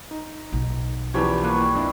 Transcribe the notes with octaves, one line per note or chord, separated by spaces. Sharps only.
D#4
B1
E2 E3 F3 C#4 G4 C#5 B5
G3 A#3 B4 C#6
F2 D4 E4